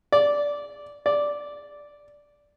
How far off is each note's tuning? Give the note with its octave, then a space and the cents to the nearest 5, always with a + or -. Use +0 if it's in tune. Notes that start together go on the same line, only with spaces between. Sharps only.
D5 -10
D5 -5